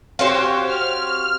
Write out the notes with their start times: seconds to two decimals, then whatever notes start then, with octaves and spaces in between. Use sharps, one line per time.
0.19 C4 F#4 G4 C5 C#5 F5
0.66 F6